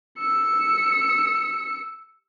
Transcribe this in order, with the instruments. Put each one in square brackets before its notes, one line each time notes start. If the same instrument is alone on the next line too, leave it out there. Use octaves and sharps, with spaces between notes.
[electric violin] E6 C#7